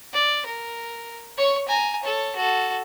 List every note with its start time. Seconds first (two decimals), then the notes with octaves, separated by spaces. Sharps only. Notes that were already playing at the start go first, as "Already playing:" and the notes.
0.13 D5
0.46 A#4
1.38 C#5 C#6
1.68 G#5 A#5
2.03 A4 C#5
2.36 F#4 A4